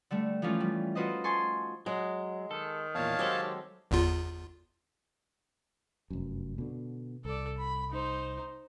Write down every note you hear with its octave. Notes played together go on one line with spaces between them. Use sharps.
D3 G3 A3
E3 F3 A3 C#4 F4
G3
D#4 F4 F#4 B4 C5 D#5
G#5 A5 C6 C#6
F#3 G#3
D#3 A4
E2 A#2 C#5 F5 A5
F#3 G#3 C4 G4 A4
G1 E2 F4
F1 F#2
B2 D3
C2 A4 D5
B5
D#4 C5